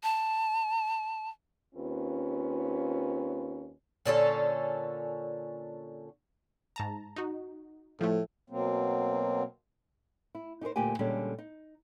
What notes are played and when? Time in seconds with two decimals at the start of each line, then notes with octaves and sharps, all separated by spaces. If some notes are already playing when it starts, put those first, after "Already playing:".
0.03 A5
1.75 D#2 C4 C#4 F4 B4
4.05 A#2 D3 C#4 A4
6.76 G#2 A5 A#5
7.16 D#4 F#4
8.01 A2 F3 A3
8.50 B2 F#3 A#3 C4
10.35 E4
10.61 D#4 G4 G#4 A#4 C5
10.76 D2 A#2 A#3 G4 G#5
10.99 A#2 D3 G3 G#3 C#4 A4
11.38 D#4